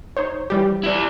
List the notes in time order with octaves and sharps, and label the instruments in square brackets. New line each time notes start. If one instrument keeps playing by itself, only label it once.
[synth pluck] D#4 C5 C#5
E3 G3 G4
[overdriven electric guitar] E4 D5